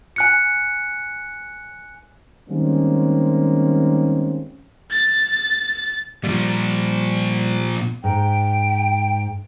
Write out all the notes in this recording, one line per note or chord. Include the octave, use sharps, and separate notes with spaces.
G#5 F#6 C#7
D#3 G3 G#3 A#3 C4 C#4
A6
A#2 F3 G3
G#2 G5